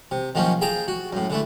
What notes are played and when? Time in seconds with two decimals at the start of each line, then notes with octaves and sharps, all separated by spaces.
0.11 C3
0.35 D#3 F3 F#3 A#3 C#4
0.61 G#4 F5 G5 A5 A#5
0.88 F#4
1.13 F#2 A2
1.30 D3 E3 A3